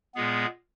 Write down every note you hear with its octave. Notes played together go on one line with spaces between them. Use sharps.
A#2 G#3 B3 G#4